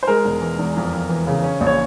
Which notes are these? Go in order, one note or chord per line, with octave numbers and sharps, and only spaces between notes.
C5
G#3 A#4
E1
E3
E2
F2
F2
E3
C#3
C#4
A#1
C#5